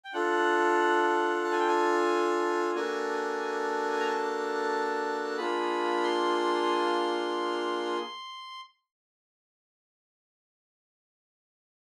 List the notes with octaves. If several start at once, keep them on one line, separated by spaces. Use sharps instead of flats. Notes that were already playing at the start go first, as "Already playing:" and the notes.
G5
D4 F4 A4 F#5
A5
G#5
G5
G#5
A#3 D4 F#4 A4 G#5
A#5
A5
A#3 D4 F4 G#4 B5
C6